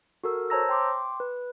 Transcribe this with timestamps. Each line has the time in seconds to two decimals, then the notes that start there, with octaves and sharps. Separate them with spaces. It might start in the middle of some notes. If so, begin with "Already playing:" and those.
0.24 F#4 A4 A#4 E6
0.50 C5 C#5 A5 A#5 E6 A#6
0.69 G5 C6 D6
1.20 B4